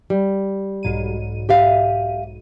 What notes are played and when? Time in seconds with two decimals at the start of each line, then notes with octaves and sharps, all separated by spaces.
0.10 G3
0.83 B1 G#2 D#7
1.49 G4 E5 F5